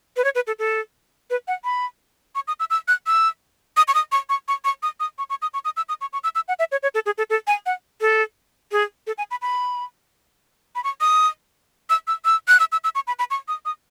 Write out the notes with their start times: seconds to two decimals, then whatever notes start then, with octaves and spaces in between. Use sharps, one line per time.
0.17 B4
0.24 C#5
0.35 B4
0.47 A4
0.59 A4
1.30 B4
1.48 F#5
1.64 B5
2.35 C#6
2.48 D#6
2.60 E6
2.70 E6
2.88 F#6
3.07 E6
3.77 D#6
3.88 C#6
3.94 D#6
4.12 C#6
4.29 C#6
4.48 C#6
4.65 C#6
4.83 D#6
5.00 D#6
5.18 C#6
5.30 C#6
5.42 D#6
5.54 C#6
5.65 D#6
5.77 E6
5.89 D#6
6.01 C#6
6.13 C#6
6.24 E6
6.35 E6
6.48 F#5
6.59 E5
6.72 C#5
6.83 C#5
6.94 A4
7.06 G#4
7.18 A4
7.30 A4
7.47 G#5
7.66 F#5
8.01 A4
8.72 G#4
9.07 A4
9.18 G#5
9.31 B5
9.42 B5
10.75 B5
10.84 C#6
11.01 D#6
11.90 E6
12.07 E6
12.25 E6
12.48 F#6
12.60 E6
12.72 E6
12.84 E6
12.95 C#6
13.07 B5
13.19 B5
13.31 C#6
13.48 D#6
13.65 D#6